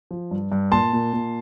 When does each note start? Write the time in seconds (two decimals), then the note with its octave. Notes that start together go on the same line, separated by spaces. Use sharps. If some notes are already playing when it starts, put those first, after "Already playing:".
0.11 F3
0.31 G2
0.52 G2
0.72 A#2 A5 C6
0.93 A#2
1.13 A#2